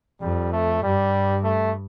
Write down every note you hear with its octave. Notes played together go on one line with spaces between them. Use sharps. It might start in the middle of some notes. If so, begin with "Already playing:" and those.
F2 G3
A3
G2 G3
A3